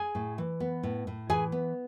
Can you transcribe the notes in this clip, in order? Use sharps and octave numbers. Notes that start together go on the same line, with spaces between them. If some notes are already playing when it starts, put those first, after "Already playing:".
Already playing: G#4 G#5
A2
E3
B3
A2
A2
E3 G#4 G#5
B3